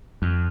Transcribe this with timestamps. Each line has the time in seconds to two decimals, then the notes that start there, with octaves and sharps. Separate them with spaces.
0.22 F2